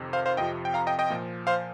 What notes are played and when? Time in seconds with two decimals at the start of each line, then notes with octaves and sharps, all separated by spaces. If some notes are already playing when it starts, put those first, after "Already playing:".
Already playing: F2 C3 D#3
0.13 C5 F5
0.26 C5 F5
0.37 F2 C3 F3 D#5 G5
0.65 G5
0.74 F5 A#5
0.87 D#5 G5
0.99 D#5 G5
1.10 A#2 F3
1.47 C5 F5